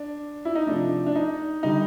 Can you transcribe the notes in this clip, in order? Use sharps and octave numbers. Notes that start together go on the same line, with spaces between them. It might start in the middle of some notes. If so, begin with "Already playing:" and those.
Already playing: D4
E4
D#4
C3 F3 A3 D4
D4
D#4
D3 G3 D#4